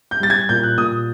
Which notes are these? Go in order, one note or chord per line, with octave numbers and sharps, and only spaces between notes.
G6
G3 A6
G#6
A#2 G6
F#6
A#2 D#6